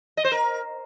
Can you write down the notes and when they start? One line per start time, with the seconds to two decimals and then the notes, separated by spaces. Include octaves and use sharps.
0.17 D#5
0.24 C5
0.32 A#4